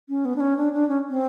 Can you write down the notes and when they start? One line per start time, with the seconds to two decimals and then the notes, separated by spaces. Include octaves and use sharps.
0.09 C#4
0.25 B3
0.36 D4
0.40 C#4
0.57 D4
0.73 D4
0.89 C#4
1.09 C4